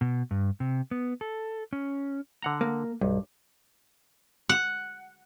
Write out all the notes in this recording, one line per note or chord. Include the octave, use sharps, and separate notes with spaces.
B2
G2
C3
B3
A4
C#4
D3 F#5 A#5
A#3
B1 G2
F#5